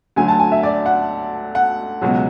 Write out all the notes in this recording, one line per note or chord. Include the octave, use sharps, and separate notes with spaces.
D2 D3 F#3 G#5
A5
G#5
E5
D5
F#5
F#5
C#2 B2 F#3